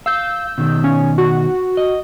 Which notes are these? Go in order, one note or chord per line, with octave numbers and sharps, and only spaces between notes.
F5 E6 G6
B2 D#3
C#4
F#4
D#5